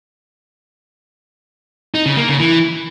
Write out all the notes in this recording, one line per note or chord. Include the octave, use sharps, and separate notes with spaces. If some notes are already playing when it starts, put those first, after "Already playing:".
D#4
C#3
A#3
C#3
E3